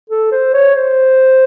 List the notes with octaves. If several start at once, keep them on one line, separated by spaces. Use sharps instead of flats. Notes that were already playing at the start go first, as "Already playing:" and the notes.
A4
C5
C#5
C5